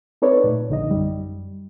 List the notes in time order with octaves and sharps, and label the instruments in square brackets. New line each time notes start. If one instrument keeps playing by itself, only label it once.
[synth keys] C4 D#4 A4 B4 C#5 D5
A#2 A3
A#1 D3 D#4 D#5
F#2 G3